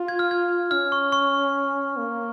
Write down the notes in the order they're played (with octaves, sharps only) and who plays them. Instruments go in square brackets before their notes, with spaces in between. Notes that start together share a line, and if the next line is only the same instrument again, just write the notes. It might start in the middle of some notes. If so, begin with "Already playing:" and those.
Already playing: [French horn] F4
[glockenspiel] G#6
F6
G#6
[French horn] C#4 [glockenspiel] F6
[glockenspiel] C#6
C#6
[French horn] A#3